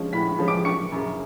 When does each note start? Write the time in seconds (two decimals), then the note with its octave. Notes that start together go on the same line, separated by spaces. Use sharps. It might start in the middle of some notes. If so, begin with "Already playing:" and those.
Already playing: F3 G#3 C#4
0.13 A2 B5 B6
0.39 F3 G#3 C#4
0.48 D6 D7
0.65 F#1 C#6 C#7
0.92 F#2 C#3